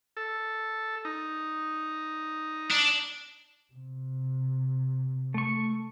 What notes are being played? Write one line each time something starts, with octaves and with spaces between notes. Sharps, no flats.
A4
D#4
D4
C3
A3 C#6